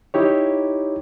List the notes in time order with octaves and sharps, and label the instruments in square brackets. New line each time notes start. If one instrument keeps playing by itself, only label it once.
[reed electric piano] D#4 E4 G4 C#5